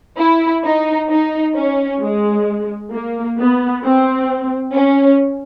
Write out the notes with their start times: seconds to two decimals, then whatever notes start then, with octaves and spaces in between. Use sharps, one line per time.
0.18 E4
0.63 D#4
1.09 D#4
1.56 C#4
2.01 G#3
2.92 A#3
3.38 B3
3.83 C4
4.74 C#4